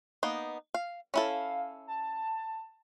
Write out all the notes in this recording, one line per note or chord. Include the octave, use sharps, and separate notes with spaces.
A#3 B3 D#4
F5
C#4 E4 A4 F5
A5